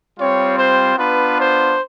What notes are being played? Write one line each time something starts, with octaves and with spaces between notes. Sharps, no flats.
G3 C4 F4 C#5
C5
B3 D4 F4 B4
C5